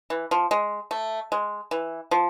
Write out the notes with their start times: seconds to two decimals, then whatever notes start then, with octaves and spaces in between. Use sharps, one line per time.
0.10 E3
0.31 F3
0.51 G#3
0.91 A3
1.32 G#3
1.71 E3
2.11 F3